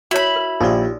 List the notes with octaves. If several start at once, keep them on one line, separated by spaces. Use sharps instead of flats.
E4 F#4 C#5 B5
A#4
A#1 D#4 F4 G4 A#4 D5